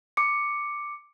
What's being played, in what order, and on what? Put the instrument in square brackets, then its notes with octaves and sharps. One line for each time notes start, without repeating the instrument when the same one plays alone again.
[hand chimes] D6 C#7